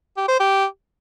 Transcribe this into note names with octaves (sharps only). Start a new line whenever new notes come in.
G4
C5
G4